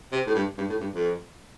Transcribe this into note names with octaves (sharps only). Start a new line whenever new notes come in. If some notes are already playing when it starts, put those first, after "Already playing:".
C3
A2
G2
G2
A2
G2
F2